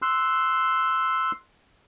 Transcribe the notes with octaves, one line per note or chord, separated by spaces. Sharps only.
C6 E6 F#6